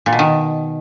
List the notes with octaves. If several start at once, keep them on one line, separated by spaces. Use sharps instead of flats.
A#2
B2
D#3